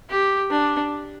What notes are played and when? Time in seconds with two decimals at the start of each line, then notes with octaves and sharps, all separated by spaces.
0.10 G4
0.50 D4